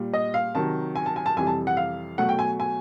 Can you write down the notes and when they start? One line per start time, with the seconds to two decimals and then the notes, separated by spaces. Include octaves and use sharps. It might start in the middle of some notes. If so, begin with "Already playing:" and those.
Already playing: A#2 G3
0.14 D#5
0.34 F5
0.55 C3 D#3 F#3 A5
0.96 G#5
1.06 A5
1.16 G#5
1.26 A5
1.36 F2 C3 E3 G3 G#5
1.47 A5
1.67 F#5
1.77 F5
2.18 B2 F#3 A3 F#5
2.29 G5
2.39 G#5
2.60 G#5